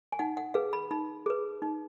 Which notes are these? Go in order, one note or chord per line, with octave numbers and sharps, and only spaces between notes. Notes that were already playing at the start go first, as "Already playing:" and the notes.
G#5
D#4 F#5
F#5
G#4 B4 F5
B5
D#4 B5
G#4 B4
D#4